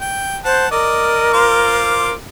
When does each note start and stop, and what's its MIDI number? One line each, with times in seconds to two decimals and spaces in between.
0.01 0.38 79
0.45 0.70 72
0.45 0.71 78
0.45 0.71 81
0.71 2.13 70
0.71 1.29 74
0.71 1.29 75
1.33 2.12 65
1.33 2.12 72
1.33 2.12 86